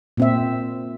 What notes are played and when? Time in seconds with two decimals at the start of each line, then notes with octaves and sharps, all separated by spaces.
0.17 A#2 C4 E5